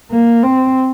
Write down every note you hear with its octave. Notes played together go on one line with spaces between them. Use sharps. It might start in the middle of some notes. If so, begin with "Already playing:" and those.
A#3
C4